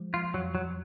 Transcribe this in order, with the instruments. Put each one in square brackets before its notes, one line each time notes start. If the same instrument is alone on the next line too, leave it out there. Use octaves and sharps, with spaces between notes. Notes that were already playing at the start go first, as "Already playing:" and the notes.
Already playing: [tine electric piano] F3 G#3
[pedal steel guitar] F4
[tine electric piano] F2 [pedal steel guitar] F#3
[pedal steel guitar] F#3